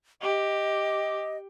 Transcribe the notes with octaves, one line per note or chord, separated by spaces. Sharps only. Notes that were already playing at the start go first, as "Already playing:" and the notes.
G4 D#5